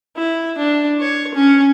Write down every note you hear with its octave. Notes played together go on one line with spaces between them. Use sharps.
E4
D4
C#5
C#4